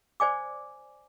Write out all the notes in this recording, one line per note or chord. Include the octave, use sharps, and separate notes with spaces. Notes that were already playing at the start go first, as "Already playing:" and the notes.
C5 D5 G#5 D6